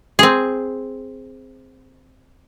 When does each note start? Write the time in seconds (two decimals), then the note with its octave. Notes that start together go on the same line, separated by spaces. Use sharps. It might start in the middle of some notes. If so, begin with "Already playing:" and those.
0.19 C4 G#4